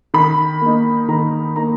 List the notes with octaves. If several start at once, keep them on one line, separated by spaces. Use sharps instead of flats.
D#3 B5
A#3 D#4
D#3 A#5
A#3 D#4 A#5